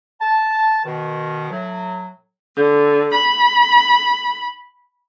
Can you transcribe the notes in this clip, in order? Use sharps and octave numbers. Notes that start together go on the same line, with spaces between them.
A5
B2 D#3
A2 F#3
D3
B5